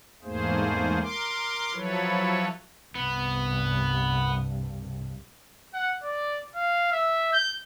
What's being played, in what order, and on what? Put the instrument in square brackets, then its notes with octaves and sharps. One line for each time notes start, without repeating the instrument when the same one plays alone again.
[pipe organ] E2 G#2 A3 A#3 G#4 C5
A#4 C6 D6
F3 F#3 E4 A4 B4 C#5
[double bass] C2 G2 [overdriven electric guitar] B3
[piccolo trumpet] F#5
D5
F5
E5
G6